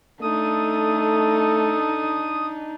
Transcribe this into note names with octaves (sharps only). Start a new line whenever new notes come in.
A3 D4 D#4 A4 D#6